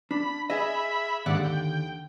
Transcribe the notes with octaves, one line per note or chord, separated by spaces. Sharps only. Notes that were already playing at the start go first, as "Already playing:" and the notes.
D4 B5
G#4 D#5 E5 B5
D#2 G#2 D3 D5 F#5
G5